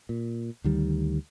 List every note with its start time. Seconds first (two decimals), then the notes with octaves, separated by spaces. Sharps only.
0.09 A#2
0.64 D2 D#3 G3